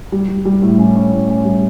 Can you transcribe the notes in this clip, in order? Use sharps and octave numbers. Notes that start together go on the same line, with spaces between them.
G3
G3
G3
A2
C#4
C#4
A2
C#4
G3